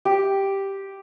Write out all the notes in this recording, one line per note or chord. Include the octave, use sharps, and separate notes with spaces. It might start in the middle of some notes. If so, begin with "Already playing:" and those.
G4